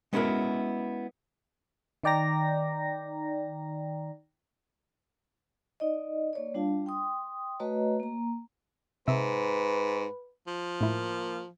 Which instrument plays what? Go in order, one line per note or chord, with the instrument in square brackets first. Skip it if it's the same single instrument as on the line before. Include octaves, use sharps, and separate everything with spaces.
[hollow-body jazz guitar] G#3 B3 C#4 E4 F#4 A#4
[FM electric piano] D#3 D#4 D5 G5 A#5 A#6
[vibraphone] D#4 D5 D#5
A#3 C#5 D5
G3 D4 F4 F5 A5
G5 C6 D#6
A3 F#4 B4 C#5 D#5 A#5
A#3 A#5
[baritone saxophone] G#2 [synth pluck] C3 E5 [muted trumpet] B4
[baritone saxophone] F3
[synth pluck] A2 E4 [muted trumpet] A#3